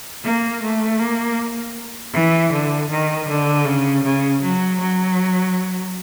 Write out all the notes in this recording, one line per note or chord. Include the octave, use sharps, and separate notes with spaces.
A#3
A3
A#3
E3
D3
D#3
D3
C#3
C#3
F#3
F#3